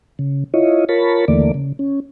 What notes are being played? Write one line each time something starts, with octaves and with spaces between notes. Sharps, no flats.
C#3
E4 F4 C#5 D#5
F4 A#4 C#5 A5 B5
D#2 D3 E3 A3 A#3 D5
C#3
C#4